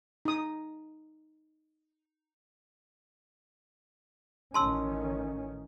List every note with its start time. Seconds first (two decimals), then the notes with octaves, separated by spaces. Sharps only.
0.25 D#4 D#6
4.54 A1 D#3 C#4 A5 C6 E6